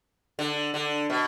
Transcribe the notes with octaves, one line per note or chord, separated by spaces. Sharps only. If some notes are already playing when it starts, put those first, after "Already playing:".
D3
D3
B2